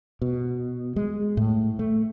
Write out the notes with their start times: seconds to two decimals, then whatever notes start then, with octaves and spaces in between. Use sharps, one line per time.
0.22 B2
0.96 G#3
1.37 A2
1.79 A3